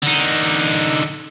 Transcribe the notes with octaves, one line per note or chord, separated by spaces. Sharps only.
D3 D#4